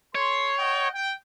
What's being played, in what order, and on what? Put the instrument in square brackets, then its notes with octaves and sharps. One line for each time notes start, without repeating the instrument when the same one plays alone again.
[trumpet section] A4 C6 [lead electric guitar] C#5
[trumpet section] D#5 F#5 G5
G5